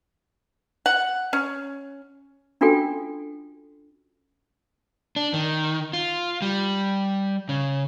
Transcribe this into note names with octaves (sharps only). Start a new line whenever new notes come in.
F#5
C#4
C#4 D4 F4 F#4 A4 G5
D4
D#3
F4
G3
C#3